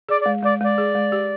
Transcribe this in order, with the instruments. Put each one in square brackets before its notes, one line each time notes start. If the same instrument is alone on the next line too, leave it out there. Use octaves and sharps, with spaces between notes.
[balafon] G#4 [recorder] D5
[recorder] D5
[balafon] G#3
[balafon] G#3 [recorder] D5
[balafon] G#3 [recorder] D5
[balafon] G#4
G#3
G4